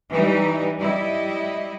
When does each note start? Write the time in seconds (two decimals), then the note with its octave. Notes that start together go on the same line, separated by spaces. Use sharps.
0.12 E3 G3 D#4
0.78 G3 E4 D#5